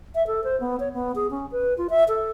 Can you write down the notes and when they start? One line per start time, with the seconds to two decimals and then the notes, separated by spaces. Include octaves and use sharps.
0.15 E5
0.27 A4
0.44 C5
0.60 B3
0.80 C#5
0.94 B3
1.16 G#4
1.31 C#4
1.52 B4
1.78 F4
1.90 E5
2.08 A4